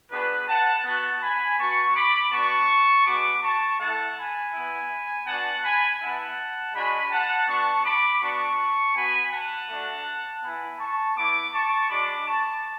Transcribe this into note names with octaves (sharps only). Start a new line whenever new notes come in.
B3 D4 F#4 G#4 B4
F#5 A5
B3 F#4 F#5 A5
G#5 B5
B3 F#4 A5 C#6
B5 D6
B3 D4 F#4 A5 C#6
G#3 B3 F#4 B5 D6
A5 C#6
A3 E4 F#5 A5
G#5 B5
B3 E4
B3 D4 F#4 F#5 A5
G#5 B5
B3 E4 F#5 A5
G#3 D4 F#4 G#5 B5
F#5 A5
B3 D4 F#4 A5 C#6
B5 D6
B3 D4 F#4 A5 C#6
B3 F#4 G#5 B5
F#5 A5
A3 D4 F#4
B3 E4 G#5 B5
A5 C#6
B3 E4 B5 D6
A5 C#6
G#3 D4 F#4 B5 D6
A5 C#6